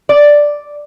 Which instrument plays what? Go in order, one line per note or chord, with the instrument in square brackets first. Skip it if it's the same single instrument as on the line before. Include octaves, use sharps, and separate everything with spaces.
[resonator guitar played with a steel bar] D5